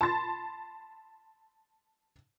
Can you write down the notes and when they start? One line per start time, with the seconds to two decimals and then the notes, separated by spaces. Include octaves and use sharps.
0.01 A5 B5 C6 A6